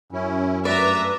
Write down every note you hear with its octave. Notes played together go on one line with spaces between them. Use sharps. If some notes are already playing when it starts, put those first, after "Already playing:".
F#2 C#4 E4
G2 A3 B4 D5 E5 A#5